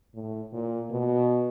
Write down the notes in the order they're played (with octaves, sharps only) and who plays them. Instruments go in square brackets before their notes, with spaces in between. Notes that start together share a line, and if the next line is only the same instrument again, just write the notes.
[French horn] A2
A#2
B2